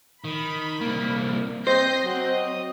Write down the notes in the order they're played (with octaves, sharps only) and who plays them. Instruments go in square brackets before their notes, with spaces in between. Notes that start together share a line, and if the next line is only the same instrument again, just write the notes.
[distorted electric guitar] D#3 [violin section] B5
[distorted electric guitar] C2 A#3
[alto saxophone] C4 [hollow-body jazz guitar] C5 [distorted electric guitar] D#5 [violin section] G6 A#6 C7
[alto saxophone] F#3 [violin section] C4